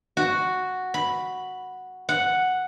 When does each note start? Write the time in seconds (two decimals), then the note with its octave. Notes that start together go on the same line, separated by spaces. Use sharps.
0.17 F#4
0.94 B5
2.09 F#5